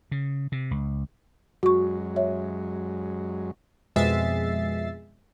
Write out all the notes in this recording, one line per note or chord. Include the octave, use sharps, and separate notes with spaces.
C#3
C3
C#2
F#2 F#3 G#3 F#4 C#6
C#5 E5
F2 B2 G#3 E5 A6 C7